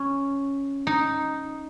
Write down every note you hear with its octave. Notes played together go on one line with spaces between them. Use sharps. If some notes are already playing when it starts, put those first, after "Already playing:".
Already playing: C#4
D#4